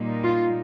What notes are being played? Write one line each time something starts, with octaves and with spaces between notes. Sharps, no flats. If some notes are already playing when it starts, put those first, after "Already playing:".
Already playing: A#2 G3 A#3 D#4
F4